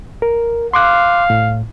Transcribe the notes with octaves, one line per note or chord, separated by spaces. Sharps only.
A#4
F5 C6 D6 F#6
A2